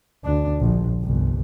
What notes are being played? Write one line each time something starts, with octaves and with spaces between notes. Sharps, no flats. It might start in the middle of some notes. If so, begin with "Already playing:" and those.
D2 D4
A#1
G1 C2